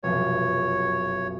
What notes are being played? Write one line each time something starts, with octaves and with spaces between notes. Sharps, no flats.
F1 B1 F#2 C#5